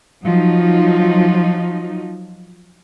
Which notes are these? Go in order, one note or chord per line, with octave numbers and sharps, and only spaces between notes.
F3 F#3 D#4